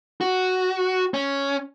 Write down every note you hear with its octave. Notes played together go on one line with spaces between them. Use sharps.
F#4
C#4